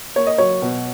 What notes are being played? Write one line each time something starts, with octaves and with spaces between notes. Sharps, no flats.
A#3 C#5
D#5
F#3 C#5
B2